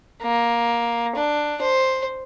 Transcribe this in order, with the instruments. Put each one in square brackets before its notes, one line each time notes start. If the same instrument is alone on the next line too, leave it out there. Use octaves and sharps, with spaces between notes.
[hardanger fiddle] A#3
D4
C5